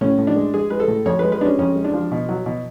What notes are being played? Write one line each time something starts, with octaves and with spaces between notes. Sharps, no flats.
A2 C#4
A2
D4
G#3
G#3 G#4
G#3 B4
A4
A2
F2 C#5
G#3 B4
B4
G#3 C#4 D4
F2 C#4
G#3
D4
F3
B2
F#3
B2